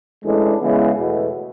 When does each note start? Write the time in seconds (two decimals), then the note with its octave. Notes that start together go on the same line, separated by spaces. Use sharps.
0.23 A1 A2 G#3 D4
0.60 C#3 E3 G#3 B3
0.97 E2 B2 A3